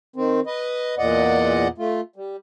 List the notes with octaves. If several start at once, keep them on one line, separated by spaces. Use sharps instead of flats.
D#3 C4
B4 D#5
E2 A#2 D5 D#5 F#5
A3 F4
G3